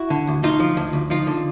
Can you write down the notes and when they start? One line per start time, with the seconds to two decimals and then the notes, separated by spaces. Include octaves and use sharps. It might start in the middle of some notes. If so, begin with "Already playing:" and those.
Already playing: E4 F#4
0.10 D3
0.27 D2
0.43 D2 D#4 F4
0.60 F3
0.77 D2
0.93 D2
1.10 F3 D#4 F4
1.27 D3